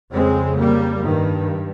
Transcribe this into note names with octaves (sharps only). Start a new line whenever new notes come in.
F2 C#3 G#3 C4
G3 A#3
G2 D#3